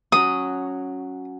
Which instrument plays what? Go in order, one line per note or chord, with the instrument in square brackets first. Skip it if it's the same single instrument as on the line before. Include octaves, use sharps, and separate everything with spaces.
[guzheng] F#3 C#4 F#4 [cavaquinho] D#6